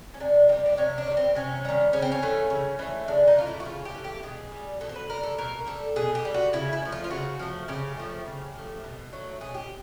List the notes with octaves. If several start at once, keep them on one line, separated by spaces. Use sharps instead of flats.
C#4
C3 D4
D#3 G3 C4
D4
C3 C#4
D4
D#3
G3
C4
C3 C#4
D#3 G3
C#3 C#4
C4
C#4
E3 A3
C#3
E3 A3
C#3 D4
D#4
E3 A3 F4
E4
F#4
C#3 F4
G4
E3 A3
G4
B2 G#4
G3
B2 A4
C5
B4
G3 A#4
A4
B2 A#4
G3 A4
B2 G#4
G4
G3
F#4
C#3 E4
E4
F3 A3
F4
F4
C#3 F#4
F3 A3
C#3 G4
F3 A3
C#3
F3 A3
B2
F#3 A3
B2 G#4
G4